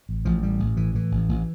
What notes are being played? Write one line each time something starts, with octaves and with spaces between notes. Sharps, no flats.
A1
A1 F3
A2 G3
A1
A2 E3
A2 E3
A1
A1